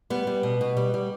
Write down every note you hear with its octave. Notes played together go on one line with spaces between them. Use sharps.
G3 B3
G3
B2
B2
G3
G3